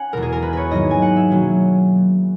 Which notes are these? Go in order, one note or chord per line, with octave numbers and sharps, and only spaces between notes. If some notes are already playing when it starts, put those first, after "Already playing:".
Already playing: C#4 F#5 G#5
E2 B2 G#3 A#4
G#4
A#4
B4
B4 C#5
G#2 D#3 F#3 A#3 D#5
G#5
F#5
E5
B2 F#3 A#3 C#4